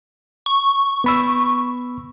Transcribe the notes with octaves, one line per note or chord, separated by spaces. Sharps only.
C#6
B3 B5 E6